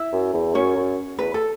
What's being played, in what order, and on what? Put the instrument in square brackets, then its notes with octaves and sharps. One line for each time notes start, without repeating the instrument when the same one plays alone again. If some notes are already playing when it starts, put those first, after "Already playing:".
Already playing: [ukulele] E4 E5
[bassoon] F#2
E2
[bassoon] F#2 [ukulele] C#4 C#5
[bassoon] F#2
[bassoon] E2 [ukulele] B4
[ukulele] A4